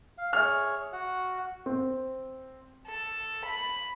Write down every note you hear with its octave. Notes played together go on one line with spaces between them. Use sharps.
F5
G#4 C#5 E5 F6
F#4 F#5
C4
A4
B5